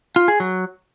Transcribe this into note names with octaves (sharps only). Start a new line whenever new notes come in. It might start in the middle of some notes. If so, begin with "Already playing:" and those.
F4
G#4
F#3